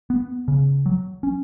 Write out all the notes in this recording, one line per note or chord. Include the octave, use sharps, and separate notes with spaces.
B3
C#3
F#3
C#4